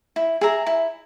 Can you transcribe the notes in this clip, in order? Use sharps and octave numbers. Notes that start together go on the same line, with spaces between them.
E4
G#4 E5 A#5
E4